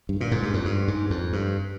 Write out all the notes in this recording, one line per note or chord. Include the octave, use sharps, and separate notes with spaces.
G2
A#2
G#2
G2
F2
G2
G#2
F2
G2